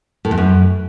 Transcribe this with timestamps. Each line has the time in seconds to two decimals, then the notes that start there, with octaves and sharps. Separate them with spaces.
0.25 A2
0.31 E2
0.38 F#2